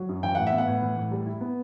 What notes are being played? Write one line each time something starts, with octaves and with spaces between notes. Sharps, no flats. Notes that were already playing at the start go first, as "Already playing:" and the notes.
Already playing: F#3
F#2
E3 G5
A2 F#5
E5
B3
F#5
A2
E3
A2
G3
E4
B3